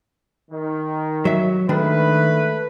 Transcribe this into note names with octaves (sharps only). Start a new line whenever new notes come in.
D#3
F#3 E5
D#3 G#3 A3 D4 B4